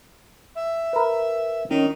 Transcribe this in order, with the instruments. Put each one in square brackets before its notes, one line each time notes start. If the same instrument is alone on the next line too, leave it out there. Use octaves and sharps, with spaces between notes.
[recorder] E5
[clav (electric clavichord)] A#4 B4
[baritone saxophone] D#3 [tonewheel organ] C#4 D#4